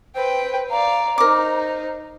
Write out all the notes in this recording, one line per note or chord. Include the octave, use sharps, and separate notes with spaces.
B4 C5 G5
D5 F5 A#5
D#4 A#4 C5 D6